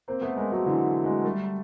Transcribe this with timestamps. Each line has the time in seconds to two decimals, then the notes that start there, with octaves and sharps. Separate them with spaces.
0.08 A#3 C4
0.21 A3 B3
0.36 G#3 A#3
0.51 F#3 G#3
0.66 D3 E3
1.04 F#3 G#3
1.24 G3 A3